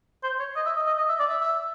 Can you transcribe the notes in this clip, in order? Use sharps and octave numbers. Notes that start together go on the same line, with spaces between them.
C5
C#5
D#5
E5
D#5
D#5
D#5
E5
D5
E5
E5